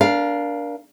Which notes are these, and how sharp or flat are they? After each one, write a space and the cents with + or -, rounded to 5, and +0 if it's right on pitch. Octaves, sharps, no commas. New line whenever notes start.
D4 -10 A#4 +25 F5 +0